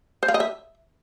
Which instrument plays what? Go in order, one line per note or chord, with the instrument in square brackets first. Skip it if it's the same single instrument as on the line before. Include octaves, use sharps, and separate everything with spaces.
[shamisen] C5
F5
D#5
E5